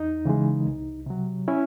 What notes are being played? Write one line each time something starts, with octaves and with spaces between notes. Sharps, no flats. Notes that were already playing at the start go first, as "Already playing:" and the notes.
Already playing: E2 D#4
C#3 E3 G#3
C2
C3 F#3
C#4 E4